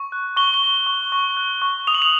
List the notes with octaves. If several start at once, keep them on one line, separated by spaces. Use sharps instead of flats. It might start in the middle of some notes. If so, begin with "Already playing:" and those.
Already playing: C#6
F#6
C#6 G7
G7
C#6
C#6
C#6
F#6
C#6
D#6 F7
F#7
F7